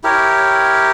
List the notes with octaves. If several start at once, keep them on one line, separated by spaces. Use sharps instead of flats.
E4 G4 A#4 C#5